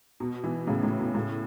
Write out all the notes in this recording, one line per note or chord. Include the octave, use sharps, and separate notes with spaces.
B2
B2 E3
A2 C#3
A2
B2
A2 C#3